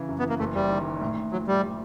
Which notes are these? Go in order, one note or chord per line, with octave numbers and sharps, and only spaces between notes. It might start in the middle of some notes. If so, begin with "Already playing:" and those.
Already playing: C#3 E3
F#2
B3
E3
A#3
F#1 A3
F#1 G3
D#3
D#3
A2
A2
F3 F#3
A2 G3